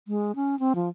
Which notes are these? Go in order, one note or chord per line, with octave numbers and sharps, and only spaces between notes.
G#3
C#4
C4
F3